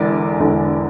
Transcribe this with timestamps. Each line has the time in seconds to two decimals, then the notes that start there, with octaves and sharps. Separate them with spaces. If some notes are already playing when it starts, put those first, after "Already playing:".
Already playing: E1 E2 D3 D5
0.40 E1 E2 D3